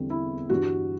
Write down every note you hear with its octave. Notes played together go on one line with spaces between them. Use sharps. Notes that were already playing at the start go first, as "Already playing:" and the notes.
Already playing: E2 D3 G3 C4 E4
E4
G2 E3 G3 D4 F#4